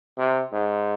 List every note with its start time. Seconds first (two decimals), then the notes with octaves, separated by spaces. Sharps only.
0.18 C3
0.52 G#2